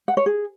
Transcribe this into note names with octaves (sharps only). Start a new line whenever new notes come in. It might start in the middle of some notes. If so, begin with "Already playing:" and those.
F#5
C#5
G#4